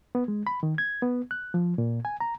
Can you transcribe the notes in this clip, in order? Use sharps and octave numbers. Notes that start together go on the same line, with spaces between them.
B3
G#3
B5
D#3
G#6
B3
F#6
F3
A#2
G#5
A#5